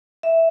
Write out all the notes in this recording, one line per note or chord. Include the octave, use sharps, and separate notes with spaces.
E5